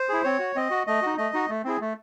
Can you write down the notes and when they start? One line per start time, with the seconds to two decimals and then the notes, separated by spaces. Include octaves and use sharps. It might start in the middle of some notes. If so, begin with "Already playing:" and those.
Already playing: C5
0.09 E4 G#4
0.24 C4 C#5
0.39 F#4
0.56 C4 D#5
0.71 F#4
0.87 A3 D#5
1.02 D#4 F#4
1.17 A3 D#5
1.34 D#4 F#4
1.49 A3
1.64 C4 E4 G#4
1.81 A3